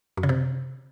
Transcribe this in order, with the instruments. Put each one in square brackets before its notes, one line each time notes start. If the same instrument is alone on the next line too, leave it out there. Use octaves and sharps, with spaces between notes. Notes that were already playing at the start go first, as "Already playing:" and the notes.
[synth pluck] F#2
C#3
C3